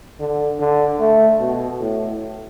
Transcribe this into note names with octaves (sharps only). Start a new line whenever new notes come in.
D3
D3
A3
B2
A2